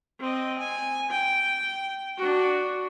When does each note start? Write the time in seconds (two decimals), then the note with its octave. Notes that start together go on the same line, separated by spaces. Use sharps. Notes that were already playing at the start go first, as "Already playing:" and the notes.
0.20 C4 D#5
0.58 G#5
1.11 G5
2.18 D4 F#4